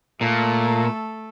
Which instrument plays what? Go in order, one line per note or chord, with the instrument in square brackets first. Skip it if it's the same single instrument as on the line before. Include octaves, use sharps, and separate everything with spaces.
[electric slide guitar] A#2 [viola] A3 A4